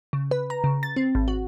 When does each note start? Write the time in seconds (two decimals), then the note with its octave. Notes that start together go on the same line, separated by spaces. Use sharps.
0.13 C#3
0.31 B4
0.50 A#5
0.64 C#3
0.83 A6
0.96 C4
1.15 G#1
1.28 F#4